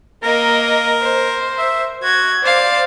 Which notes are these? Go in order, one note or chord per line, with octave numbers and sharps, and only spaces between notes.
A#3 A#4 D#5
C5
E5
F#4 G#6
C5 D5 F5